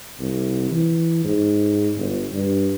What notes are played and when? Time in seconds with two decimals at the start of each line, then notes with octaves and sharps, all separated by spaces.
0.20 C2
0.71 E3
1.24 G#2
1.96 G1
2.33 G2